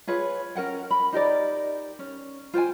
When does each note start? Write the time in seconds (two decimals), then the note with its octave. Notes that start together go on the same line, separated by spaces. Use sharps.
0.07 F4 G#4 B4 C#5
0.55 C#4 A#4 F#5 G5
0.91 B5
1.13 D#4 G4 A#4 D5
1.99 C#4
2.54 F4 C5 G5 G#5